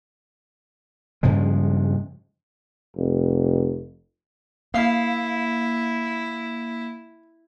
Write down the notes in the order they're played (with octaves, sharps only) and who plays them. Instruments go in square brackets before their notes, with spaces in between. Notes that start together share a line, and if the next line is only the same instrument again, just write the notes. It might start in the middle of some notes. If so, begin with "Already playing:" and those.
[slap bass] G2 C#3 F3 G#3
[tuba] F1
[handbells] A#3 C7 [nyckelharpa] E4 [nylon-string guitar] E5 F5